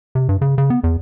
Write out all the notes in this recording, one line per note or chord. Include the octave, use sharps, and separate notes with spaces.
C3
G2
C#3
C#3
B3
E2